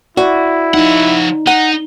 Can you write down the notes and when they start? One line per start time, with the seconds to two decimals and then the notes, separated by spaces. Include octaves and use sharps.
0.17 E4 F#4 D5
0.74 F3 D#4 F#5
1.47 D#4 F#5